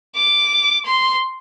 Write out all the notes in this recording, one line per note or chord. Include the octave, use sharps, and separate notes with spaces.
D6
C6